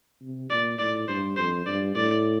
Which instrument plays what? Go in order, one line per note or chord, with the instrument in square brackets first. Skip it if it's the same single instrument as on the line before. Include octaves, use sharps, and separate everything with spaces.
[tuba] C3
[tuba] A#2 [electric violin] D5
[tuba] A2 [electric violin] D5
[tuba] G2 [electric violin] C5
[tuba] F2 [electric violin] C5
[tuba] G2 [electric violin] D5
[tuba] A2 [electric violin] D5